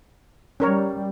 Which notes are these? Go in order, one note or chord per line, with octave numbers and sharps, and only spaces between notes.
G3 C#4 A#4 C#5